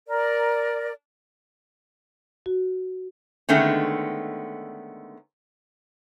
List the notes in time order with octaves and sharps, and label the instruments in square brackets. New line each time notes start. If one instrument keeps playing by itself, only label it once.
[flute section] A#4 D5
[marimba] F#4
[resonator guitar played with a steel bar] D3 D#3 G#3 A3 B3 C#4